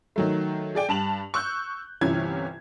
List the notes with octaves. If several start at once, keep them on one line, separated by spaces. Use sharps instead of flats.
D#3 F#3 A3
G#4 D5 G5
G2 A5 F7 F#7
C#6 E6 F#6 G6
G1 C3 E3 C#4 G#6